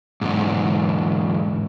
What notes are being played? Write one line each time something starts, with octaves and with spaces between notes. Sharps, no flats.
E2 G#2